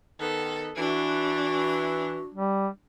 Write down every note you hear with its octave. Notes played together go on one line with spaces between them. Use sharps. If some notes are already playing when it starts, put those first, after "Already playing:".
D#3 B3 A4
E3 D4 F#4
G3